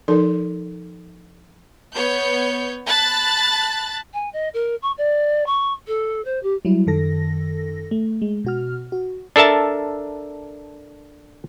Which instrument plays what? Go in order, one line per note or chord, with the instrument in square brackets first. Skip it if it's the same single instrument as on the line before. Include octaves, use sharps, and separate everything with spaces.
[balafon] F3 D#4 A4 A#4 D5 C6
[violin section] B3 C#5 G6
A5 B5 F#6 A6
[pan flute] G#5
D#5
A#4
C#6
D5
C#6
A4
C5
G4
[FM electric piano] F#3 G3 E4
F#2 D#3 A4 A#6
A3
G#3
B2 F#4 F6
F#4
[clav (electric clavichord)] D4 A4 A#4 E5 A5